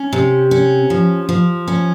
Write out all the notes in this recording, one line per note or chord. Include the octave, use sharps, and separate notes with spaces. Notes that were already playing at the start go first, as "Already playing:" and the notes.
Already playing: C#4
C3
C#4
F3
F3
C#4